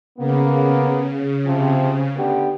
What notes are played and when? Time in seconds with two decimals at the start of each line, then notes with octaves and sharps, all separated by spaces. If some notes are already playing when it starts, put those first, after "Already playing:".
0.18 C#3 A#3 B3
1.46 C3 F3 C4
2.16 D3 B3 G4